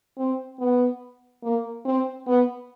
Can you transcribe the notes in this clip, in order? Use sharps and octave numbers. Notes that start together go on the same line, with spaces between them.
C4
B3
A#3
C4
B3